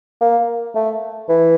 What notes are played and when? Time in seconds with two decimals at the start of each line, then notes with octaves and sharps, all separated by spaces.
0.21 A#3
0.75 A3
1.29 E3